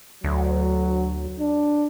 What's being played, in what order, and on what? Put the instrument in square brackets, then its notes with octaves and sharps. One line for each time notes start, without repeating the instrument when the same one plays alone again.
[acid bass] D2 [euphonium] F#3
[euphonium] D4